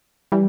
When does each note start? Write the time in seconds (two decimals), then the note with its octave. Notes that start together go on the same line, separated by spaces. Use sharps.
0.32 E3 G3